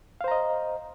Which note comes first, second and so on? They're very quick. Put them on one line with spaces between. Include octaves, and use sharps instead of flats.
F5 C5 A#5 D#5